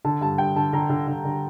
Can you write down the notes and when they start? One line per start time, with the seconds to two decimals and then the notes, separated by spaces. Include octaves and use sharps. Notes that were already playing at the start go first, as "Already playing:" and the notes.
0.05 D3 A5
0.21 G2 A5
0.38 G2 G5
0.56 D3 A5
0.73 D3 A#5
0.90 D3
1.08 D3
1.25 D3